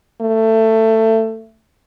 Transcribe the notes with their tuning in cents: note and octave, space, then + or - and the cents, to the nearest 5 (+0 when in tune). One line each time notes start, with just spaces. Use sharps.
A3 +20